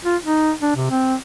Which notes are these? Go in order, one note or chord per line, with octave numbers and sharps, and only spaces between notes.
F4
D#4
D4
C3
C4